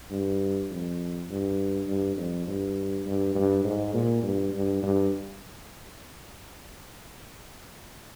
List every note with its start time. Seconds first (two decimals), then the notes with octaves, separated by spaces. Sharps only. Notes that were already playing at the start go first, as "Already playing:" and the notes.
0.11 G2
0.70 F2
1.29 G2
1.87 G2
2.16 F2
2.47 G2
3.05 G2
3.35 G2
3.64 G#2
3.94 A#2
4.23 G2
4.53 G2
4.83 G2